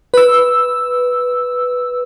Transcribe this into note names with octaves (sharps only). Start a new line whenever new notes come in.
B4 E6